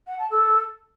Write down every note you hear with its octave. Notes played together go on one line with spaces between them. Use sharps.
F#5
A5
A4